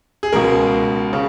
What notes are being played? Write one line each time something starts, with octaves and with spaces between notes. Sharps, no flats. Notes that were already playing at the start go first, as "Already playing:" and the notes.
G#4
C#2 B2 A#4
C#3